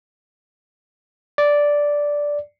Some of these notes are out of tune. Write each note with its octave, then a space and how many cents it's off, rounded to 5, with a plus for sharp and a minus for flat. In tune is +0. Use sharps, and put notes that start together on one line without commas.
D5 -5